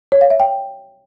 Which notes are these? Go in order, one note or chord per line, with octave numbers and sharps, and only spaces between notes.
C#5
F5
E5
G5